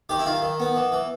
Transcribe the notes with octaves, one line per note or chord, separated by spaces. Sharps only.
D#3 G4
E4
D#3 F4
D#3
B3
E3
E3